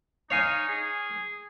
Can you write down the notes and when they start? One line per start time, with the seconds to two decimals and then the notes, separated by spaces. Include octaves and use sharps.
0.30 D#4 C#5 F5 G#5
0.69 G#4